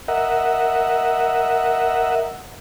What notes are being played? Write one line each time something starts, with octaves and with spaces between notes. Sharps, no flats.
A#4 D#5 E5 F#5